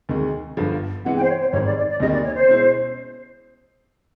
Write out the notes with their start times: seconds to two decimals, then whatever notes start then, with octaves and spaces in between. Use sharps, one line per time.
0.09 D2 C3 D#3 G#3
0.57 G1 G2 D3 F3
1.05 C3 E3 G#3 B3 F#5
1.16 G5
1.23 C5
1.29 C#5
1.40 C5
1.52 G#1 G#2 D#3 G3 C#5
1.64 D5
1.77 D5
1.89 D5
2.00 D2 C3 D#3 G3 A#3 D#5
2.12 D5
2.25 C#5
2.36 C5
2.48 B2 G#3 C#4 E4